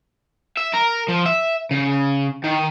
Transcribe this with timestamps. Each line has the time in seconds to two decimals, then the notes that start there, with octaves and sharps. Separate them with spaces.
0.57 E5
0.74 A#4
1.08 F3
1.26 E5
1.71 C#3
2.44 D#3